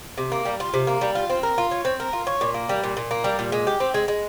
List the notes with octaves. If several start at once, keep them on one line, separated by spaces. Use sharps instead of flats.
C3
A#3
G3
F4
C3
A#3
G3
F4
C4
A#4
F4
C#5
C4
A#4
F4
C#5
A#2
A#3
G3
A#2
A#2
A#3
G3
A#2
G#3
G4
C4
G#3
G#3